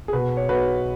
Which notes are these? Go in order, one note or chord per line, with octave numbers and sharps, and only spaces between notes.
G#4
B2 F#4 B4
C#5
B1 F#4 B4